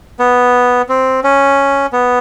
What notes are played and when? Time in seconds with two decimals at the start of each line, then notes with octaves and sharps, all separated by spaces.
0.19 B3
0.89 C4
1.24 C#4
1.93 B3